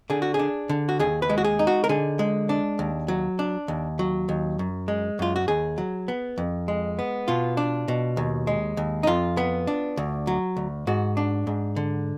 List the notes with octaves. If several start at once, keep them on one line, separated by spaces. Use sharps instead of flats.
D3 G#4
F#4
G#4
D4
D3
F#4
D#2 G#4
B4
G#3
F#4
G#4
D#4
F#4
A#4
D3 G#4
G#3
D4
D#2
F#3
D4
D#2
F#3
D#2
F#2
G#3
F#2 F4
F#4
D#2 G#4
F#3
B3
F2
G#3
B3
B2 F4
D4
B2
D#2
G#3
D#2
D#4
F2 F4
B3
D4
D2
F#3
D2
G#2 F#4
D4
G#2
D3